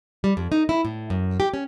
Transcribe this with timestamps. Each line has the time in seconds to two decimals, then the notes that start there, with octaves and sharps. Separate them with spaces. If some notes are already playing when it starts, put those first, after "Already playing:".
0.24 G3
0.37 F2
0.52 D#4
0.69 E4
0.85 A2
1.10 F#2
1.40 G4
1.54 C#4